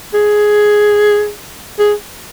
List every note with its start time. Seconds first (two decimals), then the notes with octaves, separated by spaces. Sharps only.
0.14 G#4
1.79 G#4